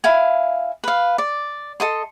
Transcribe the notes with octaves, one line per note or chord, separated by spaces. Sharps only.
E4 F5 G#5
B4 F5
D5
A4 D#5 C6